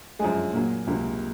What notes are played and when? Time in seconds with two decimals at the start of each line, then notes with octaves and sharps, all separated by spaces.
0.19 F#2 F3 G#3 G#4 G#5
0.53 A#2 F#3 A#3
0.87 C#2 C3 F#3 A#3